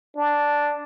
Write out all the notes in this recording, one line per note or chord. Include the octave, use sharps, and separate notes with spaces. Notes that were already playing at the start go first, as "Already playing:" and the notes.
D4